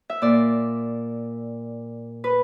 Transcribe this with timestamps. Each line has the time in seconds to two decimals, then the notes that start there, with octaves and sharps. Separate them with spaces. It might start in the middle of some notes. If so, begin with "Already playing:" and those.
0.10 E5
0.22 A#2 D5
2.24 B4